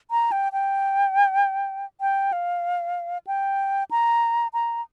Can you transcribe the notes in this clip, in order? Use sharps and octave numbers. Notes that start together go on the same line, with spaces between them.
A#5
G5
G5
G5
F5
G5
A#5
A#5